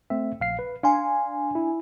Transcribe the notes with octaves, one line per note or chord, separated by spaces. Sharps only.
A3 C4 E5
A#1 F5 C7
B4
D4 F5 G#5 C6
E4